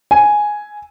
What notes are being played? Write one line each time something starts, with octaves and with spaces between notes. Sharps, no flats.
G#5